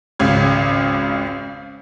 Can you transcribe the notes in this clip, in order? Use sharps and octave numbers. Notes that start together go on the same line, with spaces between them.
G#1 C#2 C#3 G#6